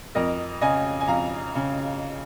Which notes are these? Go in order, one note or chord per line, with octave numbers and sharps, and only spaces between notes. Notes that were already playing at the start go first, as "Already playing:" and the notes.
F2 A#4 D#5
C#3 D#5 G#5
G#5
F2 F5 A#5
C#3